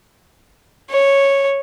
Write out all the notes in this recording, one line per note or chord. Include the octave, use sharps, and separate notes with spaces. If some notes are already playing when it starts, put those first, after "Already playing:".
C#5